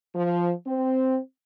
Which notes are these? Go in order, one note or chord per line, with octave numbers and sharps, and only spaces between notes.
F3
C4